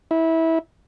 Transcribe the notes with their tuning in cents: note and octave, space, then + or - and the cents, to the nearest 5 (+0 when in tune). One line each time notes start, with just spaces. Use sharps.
E4 -20